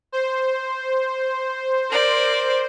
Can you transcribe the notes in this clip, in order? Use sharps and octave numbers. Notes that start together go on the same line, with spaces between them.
C5
A#4 D5